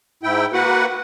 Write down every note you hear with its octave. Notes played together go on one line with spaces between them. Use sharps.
G#2 E4 G5
A#3 F#4 B4 F#5